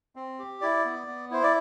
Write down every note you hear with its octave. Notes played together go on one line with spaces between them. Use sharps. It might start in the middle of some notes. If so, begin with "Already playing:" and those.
C4
G4
E4 D5
B3
B3
E4 C5
D5